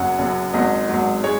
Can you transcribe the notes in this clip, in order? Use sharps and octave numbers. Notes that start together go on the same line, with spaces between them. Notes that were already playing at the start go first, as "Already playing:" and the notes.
Already playing: F#1 F#2 F#3 F#5
F#1 F#2 F#3
G#1 G#2 F#3 D#5
G#1 G#2 F#3
G#3 C#5